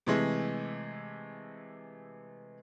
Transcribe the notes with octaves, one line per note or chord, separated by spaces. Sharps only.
C3 E3 G#3 A3